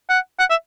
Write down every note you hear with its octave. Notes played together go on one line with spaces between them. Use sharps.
F#5
F#5
E5